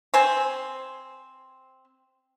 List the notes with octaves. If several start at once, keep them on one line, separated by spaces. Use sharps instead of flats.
C4 C5 G#5